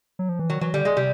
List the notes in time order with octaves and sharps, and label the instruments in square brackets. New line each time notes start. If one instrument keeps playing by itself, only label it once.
[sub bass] F#3
F3
E3
[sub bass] D#3 [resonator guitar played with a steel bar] F#3
[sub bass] E3 [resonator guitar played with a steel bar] F#3
[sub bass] D3 [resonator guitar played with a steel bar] G3
[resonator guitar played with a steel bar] G#3
[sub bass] C3 [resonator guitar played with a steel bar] G3